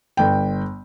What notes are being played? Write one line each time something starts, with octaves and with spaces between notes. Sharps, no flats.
G1 G5